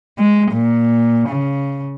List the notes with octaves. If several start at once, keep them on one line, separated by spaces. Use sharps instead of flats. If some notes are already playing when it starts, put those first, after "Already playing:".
G#3
A#2
C#3